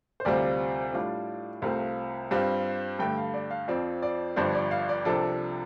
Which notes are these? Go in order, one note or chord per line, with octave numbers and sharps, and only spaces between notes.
C5
D2 C3 G3 C4 F4 D5
A2 G3 D4 F4
C2 C3 A3 C4 F4 F5
G2 G3 C4 F4
G2 D3 A3 G5
F5
D5
F5
F2 F3 C4 F4 D5
D5
G1 G2 F3 D4 C5
D5
F5
D5
C2 C3 F3 D4 A4